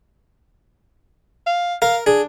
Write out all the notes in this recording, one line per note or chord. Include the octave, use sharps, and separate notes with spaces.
F5
A#4 F5
D4 G#4